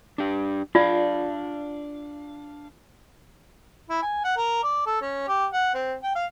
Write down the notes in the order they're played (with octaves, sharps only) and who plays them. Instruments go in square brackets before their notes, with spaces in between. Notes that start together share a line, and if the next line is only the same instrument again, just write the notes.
[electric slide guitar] D4 G4
[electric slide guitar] D4 F5 [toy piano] F4 D5
[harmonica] E4
G#5
F#5
A#4
D5
A4
C#4
G4
F#5
C4
G5
F5